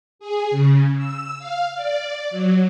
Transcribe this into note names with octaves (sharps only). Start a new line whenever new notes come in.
G#4
C#3
E6
F5
D5
F#3